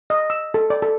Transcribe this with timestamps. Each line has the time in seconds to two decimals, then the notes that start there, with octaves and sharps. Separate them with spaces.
0.10 D#5
0.30 E6
0.54 A4
0.70 D5
0.82 A4